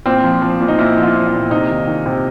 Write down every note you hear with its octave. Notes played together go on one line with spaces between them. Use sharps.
A#2 C4
F3
F3
A#2
D#4
A#2 E4
F3
F4
F3
E4
A#2
C3 D#4
D#3
D#3
C3